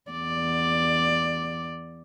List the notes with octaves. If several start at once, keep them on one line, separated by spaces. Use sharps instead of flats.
E2 D5